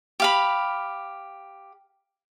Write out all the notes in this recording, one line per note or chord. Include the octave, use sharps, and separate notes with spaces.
G4 F5 B5